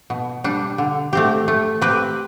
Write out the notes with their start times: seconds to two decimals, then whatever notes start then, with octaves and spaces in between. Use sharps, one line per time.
0.10 B2
0.44 G3 D4
0.78 D3
1.13 A3 C4 G4
1.48 A3
1.81 C4 G4 B4